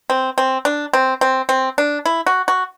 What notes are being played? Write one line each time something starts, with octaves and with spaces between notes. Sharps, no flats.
C4
C4
D4
C4
C4
C4
D4
E4
F#4
F#4